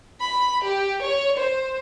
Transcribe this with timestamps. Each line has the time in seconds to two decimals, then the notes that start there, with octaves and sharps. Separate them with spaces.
0.21 B5
0.63 G4
1.01 C#5
1.37 C5